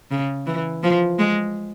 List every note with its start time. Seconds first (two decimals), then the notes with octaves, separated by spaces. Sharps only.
0.11 C#3
0.46 E3
0.83 F3
1.19 G#3